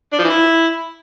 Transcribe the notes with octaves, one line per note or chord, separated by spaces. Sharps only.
D4
F3
E3
E4